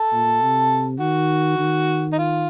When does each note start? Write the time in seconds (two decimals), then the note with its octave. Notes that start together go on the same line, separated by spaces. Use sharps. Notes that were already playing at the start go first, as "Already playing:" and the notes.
Already playing: A4
0.12 A#2
0.41 C3
1.00 D#3 F#4
1.59 D#3
2.13 D#4
2.18 F4